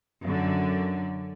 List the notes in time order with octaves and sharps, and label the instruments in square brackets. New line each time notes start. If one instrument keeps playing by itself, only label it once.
[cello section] F#2 D3